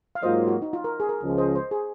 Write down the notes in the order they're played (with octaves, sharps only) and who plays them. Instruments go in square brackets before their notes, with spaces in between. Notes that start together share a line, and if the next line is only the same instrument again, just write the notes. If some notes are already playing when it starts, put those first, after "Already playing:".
[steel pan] F5
[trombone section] G#2 F#3 A#3 F4 [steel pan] C5 D#5
[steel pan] F#4
D#4
F4
A#4
G#4
A#4
[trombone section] C#2 C#3 F3 G#3 C#4
[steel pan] C5 D#5
C5
G#4